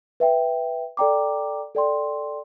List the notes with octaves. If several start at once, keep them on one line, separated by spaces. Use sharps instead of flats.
B4 E5 G5
A4 D5 G5 A#5 D6
A4 D5 G5 C6